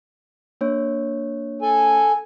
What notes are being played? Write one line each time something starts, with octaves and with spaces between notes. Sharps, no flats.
A#3 D4 C#5
A4 G#5